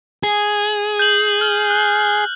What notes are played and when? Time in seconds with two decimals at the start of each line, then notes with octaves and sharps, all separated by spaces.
0.24 G#4
0.99 G6 F#7
1.41 F6
1.71 F#6